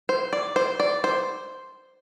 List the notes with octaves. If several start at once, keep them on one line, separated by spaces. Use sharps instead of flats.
C5
D5
C5
D5
C5